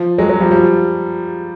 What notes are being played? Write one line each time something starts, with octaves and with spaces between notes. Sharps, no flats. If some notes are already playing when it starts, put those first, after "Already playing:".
Already playing: F3
F#3 G#3
F#3 G#3
F3 G3
F3 G3